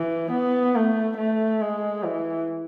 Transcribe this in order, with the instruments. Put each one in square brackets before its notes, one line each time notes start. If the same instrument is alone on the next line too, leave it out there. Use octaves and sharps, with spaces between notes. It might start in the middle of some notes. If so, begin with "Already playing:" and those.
Already playing: [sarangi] E3
B3
A3
A3
G#3
E3